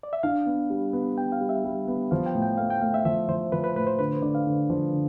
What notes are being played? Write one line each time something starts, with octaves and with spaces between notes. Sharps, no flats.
D5
E5
D4 F5
B3
G3
B3
B3 G5
F5
G3
E5
G3
B3
F3 F5
G5
A2
G5
A3 F5
G5
A3 F5
E5
F3 E5
F3 C5
F3 B4
B4
A2 B4
C5
D3 B4
C5
D3 D5
F5
D3
F3
D3